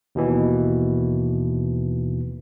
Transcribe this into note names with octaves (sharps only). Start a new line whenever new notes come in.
D#2 B2 E3